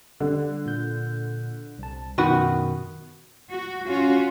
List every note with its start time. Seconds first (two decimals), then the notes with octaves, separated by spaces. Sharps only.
0.20 D3 G3
0.66 A#2 G6
1.79 C2 A5
2.18 F#2 B2 D#3 B3 F#4
3.50 F#4
3.88 C#4 F4 F#4